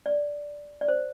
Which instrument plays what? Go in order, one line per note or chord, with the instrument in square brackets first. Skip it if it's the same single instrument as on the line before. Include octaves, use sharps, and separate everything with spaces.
[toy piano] D5
D5
C5